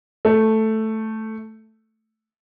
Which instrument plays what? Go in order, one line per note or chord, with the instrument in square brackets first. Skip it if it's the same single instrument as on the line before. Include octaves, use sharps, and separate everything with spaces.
[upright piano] A3